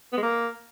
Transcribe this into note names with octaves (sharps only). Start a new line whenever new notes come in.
B3
G#3
A#3